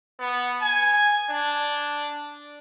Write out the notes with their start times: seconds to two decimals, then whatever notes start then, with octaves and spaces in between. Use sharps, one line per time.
0.19 B3
0.62 G#5
1.31 D4